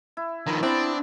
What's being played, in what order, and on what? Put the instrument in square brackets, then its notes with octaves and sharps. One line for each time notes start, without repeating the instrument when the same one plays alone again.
[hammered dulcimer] E4
[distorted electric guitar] D#3 F3 [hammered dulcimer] A#5 B5
[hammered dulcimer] B3 [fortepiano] C4 [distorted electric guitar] D4 [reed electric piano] E4